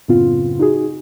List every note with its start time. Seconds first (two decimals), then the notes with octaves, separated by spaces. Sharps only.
0.08 F#2 A2 C#3 B3 C4 F4
0.59 D#4 F#4 G#4